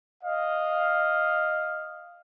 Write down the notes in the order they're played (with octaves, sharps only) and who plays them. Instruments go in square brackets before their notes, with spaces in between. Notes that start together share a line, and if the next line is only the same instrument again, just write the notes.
[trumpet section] D#5 F5